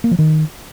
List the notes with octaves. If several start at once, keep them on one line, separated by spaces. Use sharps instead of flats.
A#3
F3
D#3